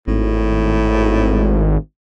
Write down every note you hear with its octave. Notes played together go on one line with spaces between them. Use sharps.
G#1 A2